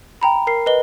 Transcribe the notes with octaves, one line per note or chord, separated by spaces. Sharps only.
G5 A#5 B5
A#4 C7
B4 D#5 G7